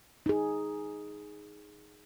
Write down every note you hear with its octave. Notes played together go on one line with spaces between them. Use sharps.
D#4 G#4